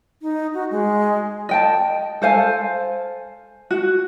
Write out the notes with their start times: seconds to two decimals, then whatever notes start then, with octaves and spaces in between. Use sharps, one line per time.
0.22 D#4
0.54 F#4
0.71 G#3
1.49 D#5 G5 A5
2.22 A4 C5 F5 G#5
3.71 F#4